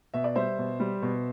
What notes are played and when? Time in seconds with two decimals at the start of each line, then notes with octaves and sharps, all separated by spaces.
0.14 B2 E5
0.24 D5
0.35 G3 C5 E5
0.58 B2
0.80 G3
1.02 B2